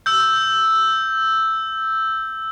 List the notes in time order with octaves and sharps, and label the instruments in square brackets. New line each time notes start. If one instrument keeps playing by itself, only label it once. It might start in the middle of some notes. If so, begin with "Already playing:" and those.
[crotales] E6 G6